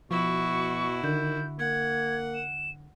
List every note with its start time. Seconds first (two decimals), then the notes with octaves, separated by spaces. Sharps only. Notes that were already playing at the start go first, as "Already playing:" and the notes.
0.11 B2 F3 E4 F#4 C#6
1.04 D3 D#3 G6
1.59 A#3 F#5 G#6
2.35 E7